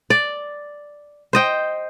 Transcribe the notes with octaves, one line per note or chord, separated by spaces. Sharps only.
D5
C5 D#5 G5